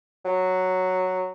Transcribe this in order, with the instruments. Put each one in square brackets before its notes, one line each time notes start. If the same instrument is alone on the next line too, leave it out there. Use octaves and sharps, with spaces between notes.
[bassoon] F#3